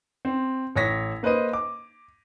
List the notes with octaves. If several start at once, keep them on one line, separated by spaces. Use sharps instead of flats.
C4
A1 C#5 A#6 B6
A#3 B4 C5 D#5 D#7
D6